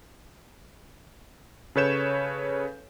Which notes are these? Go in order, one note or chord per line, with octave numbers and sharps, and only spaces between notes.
C#3 A4 B4 C#5 G6 E7